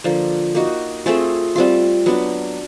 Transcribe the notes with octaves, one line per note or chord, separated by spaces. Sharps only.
D3 F3 A#3
A#3 D#4 F#4
A3 C4 F4 G#4
G3 C4 F4
F#3 B3 D4